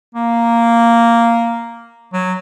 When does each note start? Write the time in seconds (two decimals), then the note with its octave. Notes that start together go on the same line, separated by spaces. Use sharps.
0.15 A#3
2.13 F#3